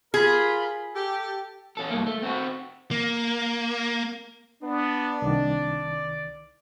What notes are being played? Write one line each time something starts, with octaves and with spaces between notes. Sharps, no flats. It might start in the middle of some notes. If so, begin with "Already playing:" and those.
F4 G#4 A#4 B5
G4 A4
C#4 A4
G2 A#3
A3
C4 F#4
A#3
B3 D4
C2 D#3 D5